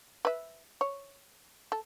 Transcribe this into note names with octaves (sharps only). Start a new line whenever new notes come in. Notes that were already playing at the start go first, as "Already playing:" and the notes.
B4 E5
C#5
A4